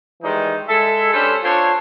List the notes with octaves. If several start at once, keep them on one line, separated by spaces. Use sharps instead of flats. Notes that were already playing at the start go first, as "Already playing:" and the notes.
D#3 E3 G3 G#3 D#4
G#3 A4 E5
C#4 D4 G4 A4 B4 C5
D4 F4 A4 C5 C#5